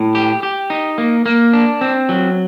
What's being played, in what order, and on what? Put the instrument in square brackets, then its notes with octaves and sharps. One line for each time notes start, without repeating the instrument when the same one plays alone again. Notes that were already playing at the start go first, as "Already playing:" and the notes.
Already playing: [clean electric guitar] A2
G4
G4
D#4
A#3
A#3
D4
C4
F#3